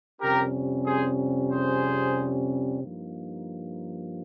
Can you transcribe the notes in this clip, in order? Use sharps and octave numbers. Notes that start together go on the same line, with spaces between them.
F2 C3 G3 C#4 G4 A#4
G#4 C5
G#4 C5
G2 F3 A#3 D#4